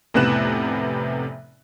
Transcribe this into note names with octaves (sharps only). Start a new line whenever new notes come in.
F1 A2 C3 B3 F#6 E7